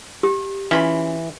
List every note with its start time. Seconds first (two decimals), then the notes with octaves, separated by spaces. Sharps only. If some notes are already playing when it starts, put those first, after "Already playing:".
0.23 G4
0.71 E3 C#4 F4 B5